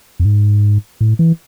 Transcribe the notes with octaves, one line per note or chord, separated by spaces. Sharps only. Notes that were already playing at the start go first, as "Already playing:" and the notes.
F2
G#2
A2
E3